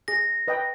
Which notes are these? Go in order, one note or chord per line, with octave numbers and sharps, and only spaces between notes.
G#4 A#6
B4 D#5 G5